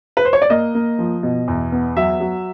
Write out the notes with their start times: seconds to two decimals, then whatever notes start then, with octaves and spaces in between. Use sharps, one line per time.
0.17 B4
0.25 C5
0.33 C#5
0.42 D5
0.50 A#3 D#5
0.75 A#3
0.99 F3
1.23 B2
1.48 E2
1.72 B3
1.97 F#3 E5
2.20 F#3